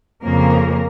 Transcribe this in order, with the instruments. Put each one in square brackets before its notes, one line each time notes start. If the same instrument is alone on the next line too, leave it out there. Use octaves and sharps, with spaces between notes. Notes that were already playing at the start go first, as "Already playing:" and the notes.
[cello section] F2 C#3 A#3 A#4